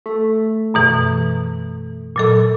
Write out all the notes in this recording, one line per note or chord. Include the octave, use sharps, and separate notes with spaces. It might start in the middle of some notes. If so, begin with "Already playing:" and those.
A3
F#2 B2 E3
A#2 F#3 A4